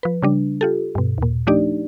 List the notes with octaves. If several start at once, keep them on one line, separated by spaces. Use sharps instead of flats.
F3 B4
C#3 G3 D4
F4 G4 A4
G2 B2
D#2 A#2
F3 A3 D4 D#4 G4 D5